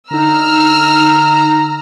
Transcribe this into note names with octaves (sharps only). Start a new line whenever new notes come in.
D3 D#4 A#5 E6 F6